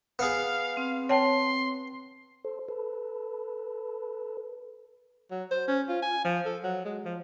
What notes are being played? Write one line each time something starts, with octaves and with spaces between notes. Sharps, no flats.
B3 G#4 F5
C4
C#5 G5 A5 C6
A4 C5
A4 B4
F#3
C5
C#4
F4
G#5
F3
A4
F#3
G#3
F3